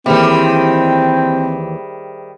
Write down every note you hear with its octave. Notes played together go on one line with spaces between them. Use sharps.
D#2 D#3 E3 G3 C4 G#4 C5 E5